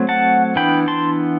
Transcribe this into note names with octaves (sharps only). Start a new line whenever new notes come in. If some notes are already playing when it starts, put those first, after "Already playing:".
Already playing: F#3 A3 C4
F#5 A5
E3 B3 D4 G5 B5
A5 C6